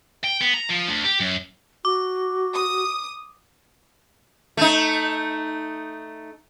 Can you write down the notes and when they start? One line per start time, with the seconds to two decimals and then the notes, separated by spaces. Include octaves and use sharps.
0.24 G5
0.42 B3
0.54 A#5
0.70 F3
0.88 D2
1.04 G4
1.21 F#2
1.85 F#4 D6
2.52 D#6
4.57 A3 D#4